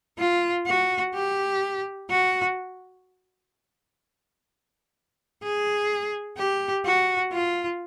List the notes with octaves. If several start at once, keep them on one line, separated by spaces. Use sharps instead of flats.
F4
F#4
G4
F#4
G#4
G4
F#4
F4